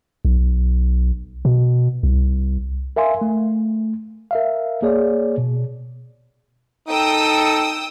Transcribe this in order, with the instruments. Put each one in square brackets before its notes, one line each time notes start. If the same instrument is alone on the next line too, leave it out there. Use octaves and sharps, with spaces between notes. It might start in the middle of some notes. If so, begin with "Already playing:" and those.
[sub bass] B1
B2
C2
[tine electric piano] A#4 E5 F5 G#5 C6
A3
A#4 E5 F5
A#3 G#4 C#5 D5
B2
[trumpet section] D#4 A4 [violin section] G5 D#6 E6